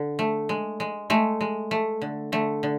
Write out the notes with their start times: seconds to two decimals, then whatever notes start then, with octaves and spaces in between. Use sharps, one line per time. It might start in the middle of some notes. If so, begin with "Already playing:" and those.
Already playing: D3
0.19 A3
0.49 G#3
0.80 G#3
1.10 G#3 A3
1.41 G#3
1.71 A3
2.02 D3
2.32 D3 A3
2.63 D3